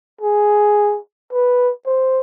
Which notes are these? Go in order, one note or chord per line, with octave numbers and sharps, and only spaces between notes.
G#4
B4
C5